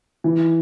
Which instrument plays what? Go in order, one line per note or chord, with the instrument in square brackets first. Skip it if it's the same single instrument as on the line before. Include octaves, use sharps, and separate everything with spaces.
[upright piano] E3